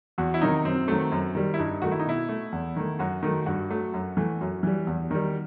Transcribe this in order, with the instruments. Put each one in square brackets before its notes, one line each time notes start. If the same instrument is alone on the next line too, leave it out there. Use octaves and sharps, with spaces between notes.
[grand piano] E2 F#4
E4
C3 D#3 F#3 D#4
F#2 C4
D#3 F#3 A3
F#2
D#3 G3
E4
G2 D#4
D#3 A3 F#4
E4
D#4
B2 E4
A3
E2
D#3 A3
F#2 F#4
D#3 A3
G2 F#4
F#3 A3
F#2
E3 A3
F#2
E3 G3
E2
D#3 G3